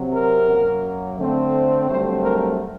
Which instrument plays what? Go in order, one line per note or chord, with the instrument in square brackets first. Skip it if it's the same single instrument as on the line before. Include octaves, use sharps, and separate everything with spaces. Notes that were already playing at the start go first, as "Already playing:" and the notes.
Already playing: [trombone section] C3 F#3 C4
A#4
F#2 F#3 A#3
D3 A3 C4
G2 F#3 A3 C4 C5
A#4